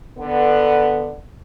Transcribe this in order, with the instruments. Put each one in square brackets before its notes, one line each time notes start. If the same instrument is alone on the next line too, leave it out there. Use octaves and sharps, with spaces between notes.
[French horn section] D3 B3